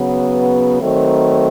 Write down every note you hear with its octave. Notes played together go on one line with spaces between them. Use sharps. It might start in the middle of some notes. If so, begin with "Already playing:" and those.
Already playing: C#3 F#3 B3
D#3 F#3 A3 C4